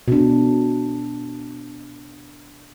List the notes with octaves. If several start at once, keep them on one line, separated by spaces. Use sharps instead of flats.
B2 D4